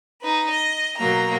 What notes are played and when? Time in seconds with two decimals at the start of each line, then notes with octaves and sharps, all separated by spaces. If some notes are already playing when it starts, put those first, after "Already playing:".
0.21 D#4 B4
0.50 D#5
0.97 B2 F#3 A#3 A#5